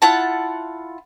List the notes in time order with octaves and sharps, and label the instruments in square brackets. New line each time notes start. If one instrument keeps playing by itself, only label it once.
[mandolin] E4 F4 F#5 A5